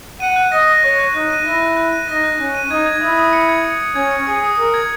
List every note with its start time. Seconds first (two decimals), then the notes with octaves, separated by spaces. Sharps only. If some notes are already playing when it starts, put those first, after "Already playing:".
0.20 F#5 D#7
0.36 F#6
0.52 D#5 A#6
0.67 A#6
0.83 C#5 F#6
0.99 F#6
1.14 D#4 F#6
1.30 D#7
1.46 E4 A#6
1.61 F#6
1.77 F#6
1.92 D#7
2.08 D#4 A#6
2.24 F#6
2.39 C#4 F#6
2.55 D#7
2.70 D#4 G#6
2.86 G#6
3.01 E4 D#6
3.17 D#6
3.33 C#7
3.49 G#6
3.64 C#7
3.80 C#7
3.95 C#4 G#6
4.11 C#7
4.27 G#4 C#7
4.43 D#6
4.58 A#4 D#6
4.74 G#6